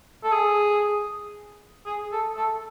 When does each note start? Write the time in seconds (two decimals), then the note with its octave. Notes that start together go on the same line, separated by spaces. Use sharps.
0.24 A4
0.32 G#4
1.86 G#4
2.12 A4
2.37 A4